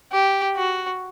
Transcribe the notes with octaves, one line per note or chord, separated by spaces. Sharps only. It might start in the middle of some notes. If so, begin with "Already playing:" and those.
G4
F#4